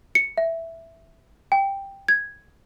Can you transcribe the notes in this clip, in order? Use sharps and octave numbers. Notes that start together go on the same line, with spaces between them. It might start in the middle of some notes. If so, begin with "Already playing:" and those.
C#7
E5
G5
G#6